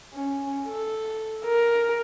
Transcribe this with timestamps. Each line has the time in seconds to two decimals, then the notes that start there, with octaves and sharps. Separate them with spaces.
0.14 C#4
0.68 A4
1.44 A#4